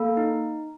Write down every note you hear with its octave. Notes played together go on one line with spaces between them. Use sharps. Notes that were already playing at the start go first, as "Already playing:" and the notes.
Already playing: A#3 A4
D#4